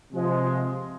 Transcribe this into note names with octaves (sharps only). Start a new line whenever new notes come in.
C3 F3 G#3